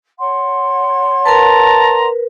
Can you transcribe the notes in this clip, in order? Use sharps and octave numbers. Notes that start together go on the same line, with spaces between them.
C#5 F#5 C6
A#4 B4 A5 A#5